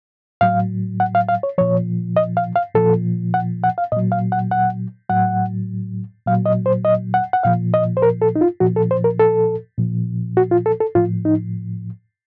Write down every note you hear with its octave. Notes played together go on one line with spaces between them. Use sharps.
A2 F#3 F5
F#5
F5
F5
C#5
A#2 F3 C#5
D#5
F5
F5
A#2 F3 A4
F#5
F#5
F5
A#2 F#3 D#5
F5
F#5
F#5
A2 F#3 F#5
A#2 F#3 F5
D#5
C5
D#5
F#5
F#5
A#2 F3 F5
D#5
C5
A#4
A4
D#4
F4
A#2 F3 F#4
A4
C5
A#4
A4
A#2 F3
F#4
F4
A4
A4
A2 F3 F4
D#4